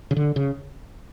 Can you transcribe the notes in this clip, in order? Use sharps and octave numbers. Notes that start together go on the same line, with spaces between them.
C#3
D3
C#3